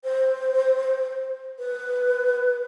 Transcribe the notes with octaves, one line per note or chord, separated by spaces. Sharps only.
C5
B4